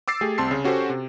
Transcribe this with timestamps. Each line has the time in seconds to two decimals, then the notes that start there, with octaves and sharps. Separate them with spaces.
0.08 D6 E6 A6 C7
0.21 A3 G4 G#4
0.38 C2 C4 A5 C6 E6 C7
0.51 C#3
0.64 C#4 F#4 G4 A4 C5
0.89 C3